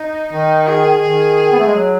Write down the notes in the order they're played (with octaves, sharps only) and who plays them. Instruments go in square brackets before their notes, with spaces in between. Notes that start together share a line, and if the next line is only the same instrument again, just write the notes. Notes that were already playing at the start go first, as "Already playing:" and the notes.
Already playing: [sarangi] D#4
[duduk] D#3 [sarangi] D#4
[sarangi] G#4
[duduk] D#3 [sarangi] G#4
[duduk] B3
A3
G#3
F#3